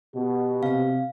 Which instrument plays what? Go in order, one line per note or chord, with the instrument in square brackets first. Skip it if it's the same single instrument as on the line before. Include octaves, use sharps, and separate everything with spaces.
[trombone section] B2 [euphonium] G4
[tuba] C3 [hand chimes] F5